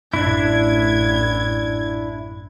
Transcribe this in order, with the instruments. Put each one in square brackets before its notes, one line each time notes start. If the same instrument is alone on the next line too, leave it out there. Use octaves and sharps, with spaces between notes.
[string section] A1 G#6 [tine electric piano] F#2 [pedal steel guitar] D4 E4